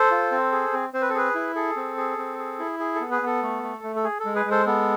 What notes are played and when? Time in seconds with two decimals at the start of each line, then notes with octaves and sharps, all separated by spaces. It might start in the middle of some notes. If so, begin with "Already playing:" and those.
Already playing: A4 C5
0.11 F4
0.32 C4
0.52 G#4
0.73 C4
0.94 C4 C5
1.01 B4
1.10 A4
1.14 G#4 B4
1.35 E4
1.55 G#4 A4
1.76 C4
1.97 G#4
2.18 C4
2.39 G#4
2.59 E4
2.80 G#4
2.95 A4
3.01 B3
3.11 G#4 B4
3.22 B3 A4
3.42 A3
3.63 A3
3.84 A3
3.96 A4
4.04 G#4
4.20 A4
4.25 G#3
4.35 G#4 B4
4.45 G#3
4.51 A4 C5
4.66 B3 A4